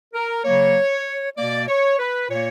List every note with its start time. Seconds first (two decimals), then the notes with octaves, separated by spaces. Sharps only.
0.13 A#4
0.44 C#3 F#3 A#3 C#5
1.37 B2 A#3 D5
1.68 C#5
1.99 B4
2.30 A#2 A#3 C#5